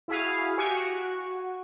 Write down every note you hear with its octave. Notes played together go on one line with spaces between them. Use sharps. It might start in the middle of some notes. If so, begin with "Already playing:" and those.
E4 F#4 G#4 F5
F#4 G4 G#5 C#6
F#4